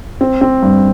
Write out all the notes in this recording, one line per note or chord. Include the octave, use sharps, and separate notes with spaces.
C4
C4
G2